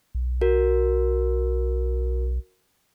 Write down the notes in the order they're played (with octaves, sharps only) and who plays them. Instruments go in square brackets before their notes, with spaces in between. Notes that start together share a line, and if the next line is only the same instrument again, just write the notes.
[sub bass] B1
[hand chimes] F#4 A#4